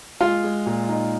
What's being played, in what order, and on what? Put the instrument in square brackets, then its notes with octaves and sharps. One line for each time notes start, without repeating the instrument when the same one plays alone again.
[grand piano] G#3 [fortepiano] F4
[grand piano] G#3
A#2
D#4